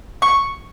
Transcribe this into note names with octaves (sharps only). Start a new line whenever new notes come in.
C#6